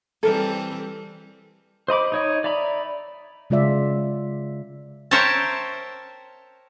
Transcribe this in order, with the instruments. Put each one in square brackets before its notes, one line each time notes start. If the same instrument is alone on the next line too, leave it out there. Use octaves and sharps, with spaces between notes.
[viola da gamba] E3 G3 C4 [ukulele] A4 A#4
[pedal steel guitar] C5 D#5 B5 D6
D#4 C#5 D#5
D5 E5 A#5 B5
[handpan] C#3 G#3 F4 D5 E5
[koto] A#4 C5 C#5 E5 G5 A5